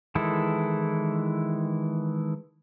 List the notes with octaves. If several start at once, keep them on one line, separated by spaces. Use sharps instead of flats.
D#3 E3 G#3 E4 A4